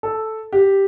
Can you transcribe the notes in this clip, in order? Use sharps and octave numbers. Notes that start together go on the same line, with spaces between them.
A4
G4